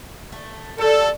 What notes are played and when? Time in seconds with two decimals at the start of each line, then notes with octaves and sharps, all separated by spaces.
0.32 A3
0.78 F#3 G3 A4